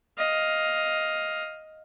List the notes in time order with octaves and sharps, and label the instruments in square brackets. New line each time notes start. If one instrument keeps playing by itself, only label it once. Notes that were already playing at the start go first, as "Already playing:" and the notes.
[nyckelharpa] D#5 F5